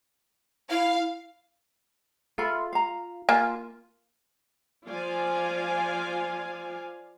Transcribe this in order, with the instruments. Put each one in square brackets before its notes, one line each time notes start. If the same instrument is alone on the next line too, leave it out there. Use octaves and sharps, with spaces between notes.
[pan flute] E4 [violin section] F5
[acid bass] F4 [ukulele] A4 E5 B5
[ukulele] F5 A#5
[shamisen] A#3 G#5 [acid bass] F4
[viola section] F3 F4 D5 F5 G#5